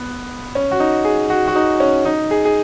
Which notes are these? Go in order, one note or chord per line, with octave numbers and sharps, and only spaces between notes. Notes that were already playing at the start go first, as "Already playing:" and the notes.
Already playing: B3
C#4
F#4
D#4
G#4
F#4
F#4
D#4
C#4
D#4
G#4
G#4